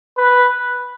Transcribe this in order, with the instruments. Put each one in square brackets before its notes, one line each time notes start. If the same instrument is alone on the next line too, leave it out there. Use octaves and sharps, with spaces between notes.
[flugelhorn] B4